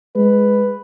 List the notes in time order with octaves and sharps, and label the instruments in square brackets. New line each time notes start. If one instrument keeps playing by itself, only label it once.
[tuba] G#3 [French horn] B4